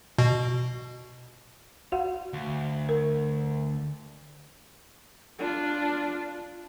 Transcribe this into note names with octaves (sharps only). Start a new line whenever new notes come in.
B2
F#4 F5 F#5
D2
A#4
D4 F4